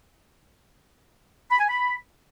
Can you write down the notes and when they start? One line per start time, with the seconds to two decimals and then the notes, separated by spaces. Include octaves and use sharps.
1.51 B5
1.60 G#5
1.69 B5